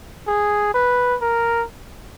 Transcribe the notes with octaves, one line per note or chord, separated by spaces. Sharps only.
G#4
B4
A#4